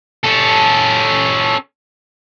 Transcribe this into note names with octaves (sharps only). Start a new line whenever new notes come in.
C#4 A4